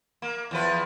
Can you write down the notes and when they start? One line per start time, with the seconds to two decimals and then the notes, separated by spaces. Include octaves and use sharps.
0.22 A#3
0.51 E2 F3 B4